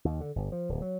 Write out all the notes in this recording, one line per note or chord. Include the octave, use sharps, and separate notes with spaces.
D#2
D3
G1
F3
D1
F#3